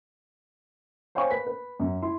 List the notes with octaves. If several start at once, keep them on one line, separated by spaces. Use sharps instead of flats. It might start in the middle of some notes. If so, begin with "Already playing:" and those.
C5 C#5 F5 G5 G#5 C#6
B4 B6
B4
F#2
E4 C6